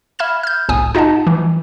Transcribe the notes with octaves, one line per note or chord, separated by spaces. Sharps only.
E5 B5 F6 G#6 E7
F6 G6
G1 C2 A2 G#5 D#6
D#4 F4 D#5 F#5 A5
E3